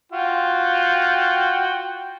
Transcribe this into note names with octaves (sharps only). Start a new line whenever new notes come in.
F4 F#4 G5